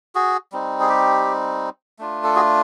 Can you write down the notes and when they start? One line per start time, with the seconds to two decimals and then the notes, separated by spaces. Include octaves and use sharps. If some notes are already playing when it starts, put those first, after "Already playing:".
0.15 F#4 G#4
0.52 G3 C4 D#4
0.80 G#4
0.89 G4
1.99 A3 D4 F4
2.24 A4
2.36 F#4 G#4